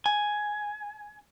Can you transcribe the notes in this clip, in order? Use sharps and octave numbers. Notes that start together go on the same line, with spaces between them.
G#5